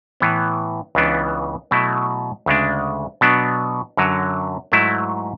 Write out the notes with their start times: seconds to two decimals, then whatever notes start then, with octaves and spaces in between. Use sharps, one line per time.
0.20 A2 E3 B3
0.95 C#2 C#3 E3 B3 D4
1.71 B2 F#3 A3 E4
2.46 D2 C#3 G#3 D4
3.21 B2 F#3 B3 D4
3.97 F#2 D3 F#3
4.72 G#2 F#3 A3 E4